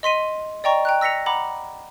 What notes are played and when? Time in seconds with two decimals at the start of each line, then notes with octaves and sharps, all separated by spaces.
0.03 D#5 C6 B6 D#7
0.64 D5 D#5 G5 A#5 C#6
0.85 G5 A#5 F#6
1.01 E6 A#6 B6 C#7 F7
1.26 F#5 A#5 B5 D6